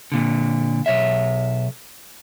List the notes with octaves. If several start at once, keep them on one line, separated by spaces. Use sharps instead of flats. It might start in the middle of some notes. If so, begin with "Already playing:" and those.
A#2 D3
B1 C#5 E5